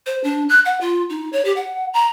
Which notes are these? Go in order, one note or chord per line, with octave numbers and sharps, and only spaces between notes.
C5
D4
F#6
F#5
F4
D#4
C#5
G4
F#5
A#5